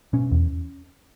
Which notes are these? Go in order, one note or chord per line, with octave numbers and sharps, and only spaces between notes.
B2 C#4
E2